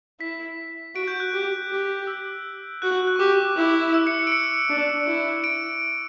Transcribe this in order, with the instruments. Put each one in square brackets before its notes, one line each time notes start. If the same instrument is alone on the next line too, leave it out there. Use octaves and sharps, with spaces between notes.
[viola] E4 [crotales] B6
[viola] F#4 [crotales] D7
[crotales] G6
F#6
[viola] G4
G4
[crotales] E6
[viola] F#4 [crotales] F#6
[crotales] F#6
C#6
[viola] G4 [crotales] D6
[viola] E4
[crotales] E6
C#7
C#7
D7
C#7
[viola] D4
E4
[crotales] D7